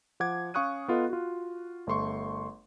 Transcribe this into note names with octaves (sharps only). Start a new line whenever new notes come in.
F3 F#5 D6 G#6
C#4 F5 C#6 D#6 F#6 D#7
B3 F4 A4 D#5
F4 F#4
G1 A3 C6 C#6